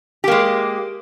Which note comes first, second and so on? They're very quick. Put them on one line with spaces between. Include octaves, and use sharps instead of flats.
G4 A#3 G#3